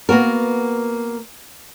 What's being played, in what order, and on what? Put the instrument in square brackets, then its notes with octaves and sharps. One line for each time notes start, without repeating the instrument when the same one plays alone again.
[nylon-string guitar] A#3 B3 F#4 A#4